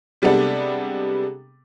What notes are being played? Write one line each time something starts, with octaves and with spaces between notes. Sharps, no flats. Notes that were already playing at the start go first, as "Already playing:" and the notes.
C3 G3 G#3 B3 D4 A4